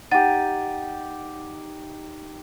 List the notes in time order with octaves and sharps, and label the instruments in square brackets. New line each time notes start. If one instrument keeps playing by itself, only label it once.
[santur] D#4 G4 [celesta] F#5 A6 D#7